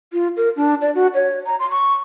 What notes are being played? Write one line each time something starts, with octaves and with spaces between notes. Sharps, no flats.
F4
A#4
D4
D5
F#4
C#5
A#5
C6
C#6